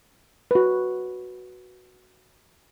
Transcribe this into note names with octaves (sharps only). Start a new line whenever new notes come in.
F#4 B4